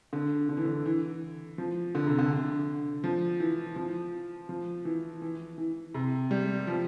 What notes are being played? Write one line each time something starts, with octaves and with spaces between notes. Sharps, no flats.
D3
D3
E3
D3
E3
F3
D3
C3
D3
D3
F3
E3
F3
F3
E3
E3
E3
C3
G3
F3